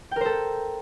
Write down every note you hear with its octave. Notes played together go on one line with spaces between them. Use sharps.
A4 A#4 C5 G5